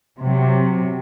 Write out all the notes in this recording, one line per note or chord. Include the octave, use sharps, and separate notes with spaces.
C3 F#3